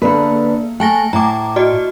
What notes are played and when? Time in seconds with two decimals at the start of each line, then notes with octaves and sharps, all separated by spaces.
0.02 D3 A#3 B3 B4
0.80 A3 G5 G#5 A#6
1.13 A2 A#5 D6
1.56 F#4 D5 D#5